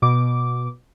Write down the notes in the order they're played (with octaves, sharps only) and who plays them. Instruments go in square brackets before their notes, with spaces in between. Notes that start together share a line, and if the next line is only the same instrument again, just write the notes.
[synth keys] B2 D6